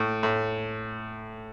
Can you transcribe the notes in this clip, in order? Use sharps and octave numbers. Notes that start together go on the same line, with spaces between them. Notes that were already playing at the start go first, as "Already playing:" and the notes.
Already playing: A2
A2